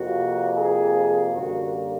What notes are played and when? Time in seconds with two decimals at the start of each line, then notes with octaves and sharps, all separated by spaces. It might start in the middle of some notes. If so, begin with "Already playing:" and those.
Already playing: F2 C3 F3 A#3 F#4
0.57 G#4
1.34 F#2 D3 G3 A#3 F#4